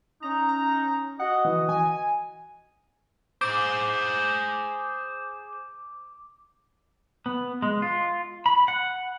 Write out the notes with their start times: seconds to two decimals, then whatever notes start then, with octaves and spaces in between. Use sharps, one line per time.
0.22 C#4 D#4 A#5
0.49 A#5
1.19 F#4 D#5 F#5
1.45 E3
1.69 G#5
3.41 G#4 C5 D6
7.26 B3
7.62 G#3
7.82 F4
8.46 B5
8.68 F#5